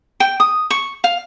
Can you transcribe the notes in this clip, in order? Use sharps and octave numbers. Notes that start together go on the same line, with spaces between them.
G5
D#6
C#6
F5